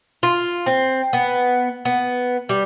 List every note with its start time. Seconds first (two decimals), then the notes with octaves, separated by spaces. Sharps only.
0.23 F4
0.66 C4
1.13 B3
1.85 B3
2.49 G3